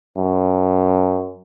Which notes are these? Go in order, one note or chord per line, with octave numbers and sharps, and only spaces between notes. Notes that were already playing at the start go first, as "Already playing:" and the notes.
F#2